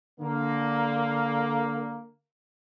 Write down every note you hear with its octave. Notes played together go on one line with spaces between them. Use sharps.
D3 A#3